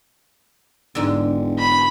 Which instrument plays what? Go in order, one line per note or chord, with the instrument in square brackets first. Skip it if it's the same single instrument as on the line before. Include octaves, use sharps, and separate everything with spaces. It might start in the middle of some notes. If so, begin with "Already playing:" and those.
[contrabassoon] E1 [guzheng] G#2 D3
[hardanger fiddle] B5